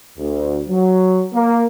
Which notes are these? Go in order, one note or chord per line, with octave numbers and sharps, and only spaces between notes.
D2
F#3
A#3